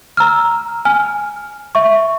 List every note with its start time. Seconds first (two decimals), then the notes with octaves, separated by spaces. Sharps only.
0.17 A#5 E6 F6
0.85 G#5 F6
1.75 E5 C#6